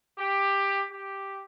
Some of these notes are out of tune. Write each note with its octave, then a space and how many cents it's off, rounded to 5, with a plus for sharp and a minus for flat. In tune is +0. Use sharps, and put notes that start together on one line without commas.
G4 +10
G4 +0